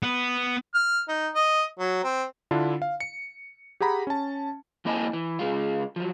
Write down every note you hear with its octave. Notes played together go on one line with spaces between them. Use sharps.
B3
F6
D#4
D#5
F#3
C4
D3 D4 E4 F4
F5
C#7
G4 G#4 F#5 A#5 B5
C#4 A5
F2 A#3 E4 D#5 G#5 A5
E3
C#3 G#3 F4
F3 F#3